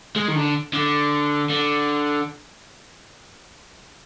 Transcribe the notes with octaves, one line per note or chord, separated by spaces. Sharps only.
G#3
D#3
D3
D3
D3